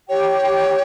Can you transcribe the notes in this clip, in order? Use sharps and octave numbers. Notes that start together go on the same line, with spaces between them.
G4 C#5 G5